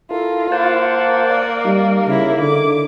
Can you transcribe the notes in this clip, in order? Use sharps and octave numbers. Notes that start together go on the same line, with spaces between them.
E4 F4 A4 A#4
A#3 C5 F#5 A5
D5
G3 D#4
C#3 E4 A#4
D3 D6